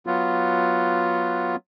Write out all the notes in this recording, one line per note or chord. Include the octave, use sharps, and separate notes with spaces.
F#3 B3 F4